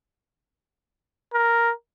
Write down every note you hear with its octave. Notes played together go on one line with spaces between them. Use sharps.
A#4